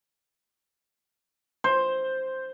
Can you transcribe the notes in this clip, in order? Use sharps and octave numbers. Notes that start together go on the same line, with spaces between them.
C5